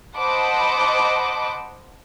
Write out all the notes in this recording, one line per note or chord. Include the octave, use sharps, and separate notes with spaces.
C5 D#5 F#5 A5 B5 D6